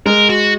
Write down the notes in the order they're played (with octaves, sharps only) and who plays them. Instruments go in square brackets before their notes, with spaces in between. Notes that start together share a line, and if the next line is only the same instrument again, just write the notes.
[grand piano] G#3 [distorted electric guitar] A#4
[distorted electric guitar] F#4